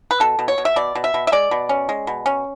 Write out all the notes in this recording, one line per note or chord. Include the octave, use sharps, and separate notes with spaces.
B4
B2 A4
B2
C#5
B2
E5
B2 D5
B2
E5
B2
E5
G#3 D5
B2
C#4
G#3
B2
C#4